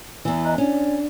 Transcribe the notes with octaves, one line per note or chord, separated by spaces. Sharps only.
E2 E3
D#5 A#5 F#6
C#4 D4 D5